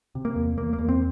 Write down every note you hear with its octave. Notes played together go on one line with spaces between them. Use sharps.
C3
A#3
E2
E2 A#3
A#3
E2
C4